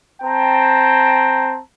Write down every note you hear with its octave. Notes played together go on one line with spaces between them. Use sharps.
C4 G5 A5 A#5